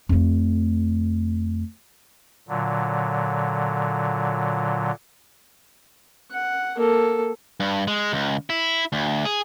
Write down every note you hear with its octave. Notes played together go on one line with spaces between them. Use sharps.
F2 A3
A#2 D3 F#3
F#5
A#3 A4
G2
G#3
C#2
E4
D2
G#4